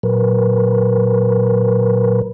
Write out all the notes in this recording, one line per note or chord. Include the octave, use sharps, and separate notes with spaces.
A#2 F#3 A#4 B4